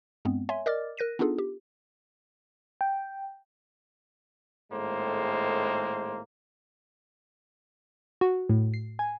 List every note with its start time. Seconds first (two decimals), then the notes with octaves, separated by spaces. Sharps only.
0.25 G2 G#3 B3 C4
0.49 C#5 E5 G#5 C6
0.66 A#4 D5 D#5 D6 F6 A6
0.97 A#4 F#6 A#6 D#7
1.19 B3 D4 D#4 F4 G#4 A4
1.38 G4
2.81 G5
4.71 G#1 A2 G#3 A#3 A4 C5
8.21 F#4
8.49 A2
8.74 C7
8.99 G#5